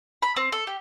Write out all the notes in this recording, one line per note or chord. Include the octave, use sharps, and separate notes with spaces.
B5
C4
A4
G4